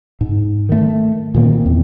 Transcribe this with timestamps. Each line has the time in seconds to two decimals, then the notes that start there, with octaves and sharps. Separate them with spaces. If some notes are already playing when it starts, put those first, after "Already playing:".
0.21 G#2
0.69 D#3 A3
1.34 A#2 D#3 A#3 C4
1.66 E2